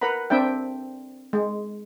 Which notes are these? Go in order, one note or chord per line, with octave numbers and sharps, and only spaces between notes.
A#4 B4 F#5 A#5 B5
C4 D4 E5 G5
G#3